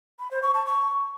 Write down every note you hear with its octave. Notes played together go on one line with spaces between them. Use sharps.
B5
C5
C#6
A5
C#6